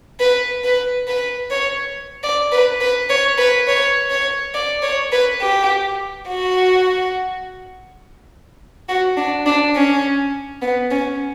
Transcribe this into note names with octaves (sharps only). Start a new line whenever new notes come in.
B4
B4
B4
C#5
D5
B4
B4
C#5
B4
C#5
C#5
D5
C#5
B4
G4
F#4
F#4
D4
D4
C#4
B3
C#4